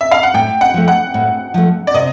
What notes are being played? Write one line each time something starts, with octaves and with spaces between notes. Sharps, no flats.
E5
F5
F#5
A2 G5
F#5
F3 A3
F#5
A2
F3 A3
D5
C3 D#5